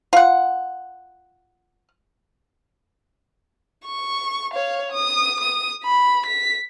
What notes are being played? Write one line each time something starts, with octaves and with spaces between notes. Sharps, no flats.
F4 F#5
C#6
C#5 F5
D#6
D#6
B5
B6